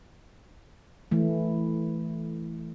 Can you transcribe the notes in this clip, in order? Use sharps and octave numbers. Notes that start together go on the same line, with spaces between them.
E3 A3